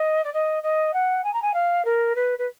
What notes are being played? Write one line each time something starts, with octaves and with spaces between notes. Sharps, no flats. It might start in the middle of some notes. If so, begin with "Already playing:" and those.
Already playing: D#5
D5
D#5
D#5
F#5
G#5
A#5
G#5
F5
A#4
B4
B4